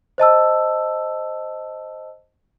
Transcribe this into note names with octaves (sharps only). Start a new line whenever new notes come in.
C5 D#5 A5 E6